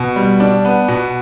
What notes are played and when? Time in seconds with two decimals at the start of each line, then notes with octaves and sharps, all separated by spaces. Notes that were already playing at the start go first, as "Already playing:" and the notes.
Already playing: B2
0.16 G3
0.40 D4
0.65 B3
0.88 B2